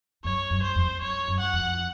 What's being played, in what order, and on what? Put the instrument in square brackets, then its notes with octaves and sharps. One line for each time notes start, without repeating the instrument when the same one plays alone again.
[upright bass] F#2 [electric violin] C#5
[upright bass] F#2
[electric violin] C5
[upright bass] F2
[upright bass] F#2 [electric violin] C#5
[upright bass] F#2
[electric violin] F#5
[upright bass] F2